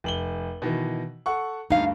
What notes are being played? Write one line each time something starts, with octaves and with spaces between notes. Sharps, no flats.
F1 F#7 G7
B2 D#3 E3
A4 F#5 C#6
D2 G2 D#4 F5